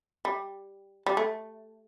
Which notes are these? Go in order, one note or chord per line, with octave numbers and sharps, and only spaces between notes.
G3
G3
A3